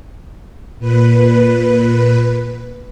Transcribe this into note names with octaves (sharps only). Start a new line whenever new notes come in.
A#2 B4